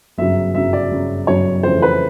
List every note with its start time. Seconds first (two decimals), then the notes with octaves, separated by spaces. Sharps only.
0.18 G1 F#2 C#3 F#3 E5
0.55 G1 F#2 C#3 F#3 E5
0.73 D5
0.91 G1 F#2 C#3 F#3
1.27 G1 F#2 C#3 F#3 C#5
1.63 F2 C#3 E3 A3 C5
1.82 B4